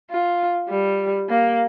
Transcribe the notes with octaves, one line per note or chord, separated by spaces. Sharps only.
F4
G3
A#3